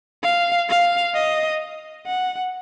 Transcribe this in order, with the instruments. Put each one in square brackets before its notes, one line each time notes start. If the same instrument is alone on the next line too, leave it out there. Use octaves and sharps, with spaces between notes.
[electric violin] F5
F5
D#5
F#5